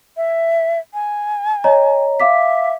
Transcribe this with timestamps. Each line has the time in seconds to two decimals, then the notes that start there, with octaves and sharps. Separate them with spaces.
0.17 E5
0.94 G#5
1.64 C#5 D#5 A#5
2.20 E5 F5 D6 B6